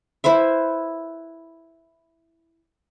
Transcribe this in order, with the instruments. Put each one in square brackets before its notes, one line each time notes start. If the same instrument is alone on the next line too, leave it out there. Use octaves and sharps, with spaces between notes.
[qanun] E4 B4 C5 E5